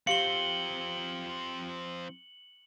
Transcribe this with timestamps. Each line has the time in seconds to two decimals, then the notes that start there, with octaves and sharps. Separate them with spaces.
0.07 F3 C4 G4 F5 C#7 F#7 G7